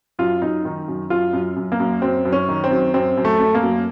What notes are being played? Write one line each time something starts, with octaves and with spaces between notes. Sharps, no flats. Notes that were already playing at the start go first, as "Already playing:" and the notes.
F#2 F4
F#2 D#4
D#3
F#2
F#2 F4
F#2
F#2
A#3
F#2
F#2 C4
F#2
C#4
D#3
C4
F#2
F#2 C4
F#2
A3
F#2
A#3
F#2